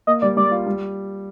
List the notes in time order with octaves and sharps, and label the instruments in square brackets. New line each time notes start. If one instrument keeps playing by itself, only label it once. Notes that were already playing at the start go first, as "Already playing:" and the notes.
[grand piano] A#3 [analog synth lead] D#5
[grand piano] G3 [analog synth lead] D5
[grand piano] G3 [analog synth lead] D5
[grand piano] F4
G3